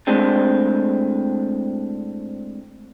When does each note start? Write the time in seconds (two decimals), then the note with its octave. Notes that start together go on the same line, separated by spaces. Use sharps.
0.07 A2 G#3 C4 D4